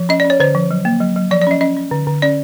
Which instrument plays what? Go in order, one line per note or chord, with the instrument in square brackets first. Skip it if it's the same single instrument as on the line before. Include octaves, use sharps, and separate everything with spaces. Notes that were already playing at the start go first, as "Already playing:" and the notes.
Already playing: [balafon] F3
C#4 D#5
D5
C#4
C#5
D3 C5
F3
F#3
A#3
F#3
F#3
F3 D5
D5
C#4 D#5
C#4 D#5
C#4
D3
D3
C#4 D5